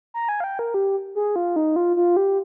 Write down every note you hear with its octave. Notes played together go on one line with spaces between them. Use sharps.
A#5
G#5
F5
G5
A#4
G4
G#4
F4
D#4
F4
F4
G4